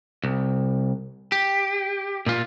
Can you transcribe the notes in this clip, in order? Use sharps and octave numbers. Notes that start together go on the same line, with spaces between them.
C2
G4
A#2 F4